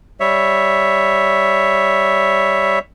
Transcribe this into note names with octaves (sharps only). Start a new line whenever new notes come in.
G3 C#5 E5